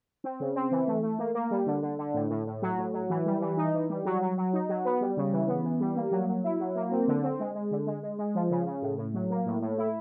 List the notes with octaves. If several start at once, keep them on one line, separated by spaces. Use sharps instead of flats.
C4
C#3
C4
E3
A3
A3
A#3
A#3
G3
D3
D3
D3
A2
A2
A2
F#3
A2
F#3
E3
G3
E3
D#4
E3
G3
F#3
F#3
F#3
D#4
F#3
B3
G3
C#3
E3
B3
E3
G3
A#3
F#3
F#3
E4
F#3
A#3
C4
D3
C4
G#3
G#3
D3
G#3
G#3
G#3
F3
C#3
C#3
A2
A2
F#3
A#3
A2
A2
E4